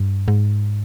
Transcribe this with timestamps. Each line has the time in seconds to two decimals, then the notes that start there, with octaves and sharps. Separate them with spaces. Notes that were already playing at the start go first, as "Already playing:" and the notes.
Already playing: G2
0.28 G#2